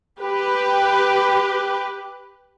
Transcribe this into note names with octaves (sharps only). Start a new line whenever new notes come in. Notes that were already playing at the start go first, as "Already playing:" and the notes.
G4 B4